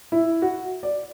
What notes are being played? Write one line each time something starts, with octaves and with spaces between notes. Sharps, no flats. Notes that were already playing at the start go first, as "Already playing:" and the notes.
E4
F#4
D5